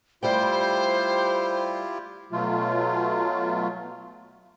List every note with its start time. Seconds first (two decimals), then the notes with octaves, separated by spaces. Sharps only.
0.23 G3 A3 E4 F4 G4 C5 G5
2.32 B2 F#3 A3 F4